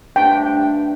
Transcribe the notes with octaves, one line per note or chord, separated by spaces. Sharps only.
G2 A3 D4 G5